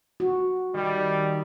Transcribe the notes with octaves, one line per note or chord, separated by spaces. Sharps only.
F#4
D#3 G3